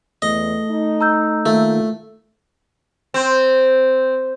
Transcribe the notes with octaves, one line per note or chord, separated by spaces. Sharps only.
E2 A3 D#5
D#4
A#5 E6 G6
D#3 A3 A#3 F4
C4